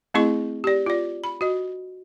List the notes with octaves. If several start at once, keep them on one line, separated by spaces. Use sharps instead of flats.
A3 C4 E4 G#4 D#5 C#6
G4 D5
F4 D5
B5
F#4 D#5